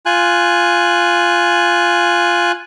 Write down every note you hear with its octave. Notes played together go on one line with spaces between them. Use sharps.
F4 G#5 F#6